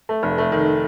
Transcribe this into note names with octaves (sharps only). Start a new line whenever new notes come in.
A3
F1
A3
D#3